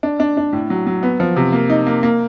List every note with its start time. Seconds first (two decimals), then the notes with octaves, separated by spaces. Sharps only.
0.03 D4
0.20 D4
0.37 D4
0.53 A2
0.70 F#3
0.87 F#3
1.03 B3
1.20 F3
1.36 C3
1.52 A#3
1.70 D#4
1.87 A#3
2.03 A#3